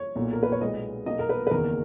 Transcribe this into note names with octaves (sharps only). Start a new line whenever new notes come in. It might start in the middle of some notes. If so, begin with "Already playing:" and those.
Already playing: C#5
B1 A#2 A#3
A#4
B4
C#5
B1 A#2 G#3 B3 D#5
B1 B2 A#3 D#5
A#4
B4
B4
F#1 E2 D#3 A#3 A#4